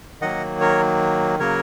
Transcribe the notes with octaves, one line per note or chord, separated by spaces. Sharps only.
D#3 F#3 A#3 D#5 F#5
A#4 C#5
C#3 F#3 A#3 A#4 C#5